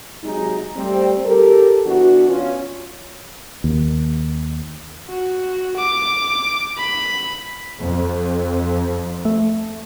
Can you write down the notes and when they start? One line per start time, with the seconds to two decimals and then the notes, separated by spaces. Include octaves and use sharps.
0.23 C3 F#3 G#3 D#4
0.76 G3 A3 C4
1.24 G4 A4 A#4
1.85 E3 B3 D4 F#4
2.28 C#4 F4
3.64 D#2
5.09 F#4
5.77 D6
6.78 B5
7.82 F2
9.25 A3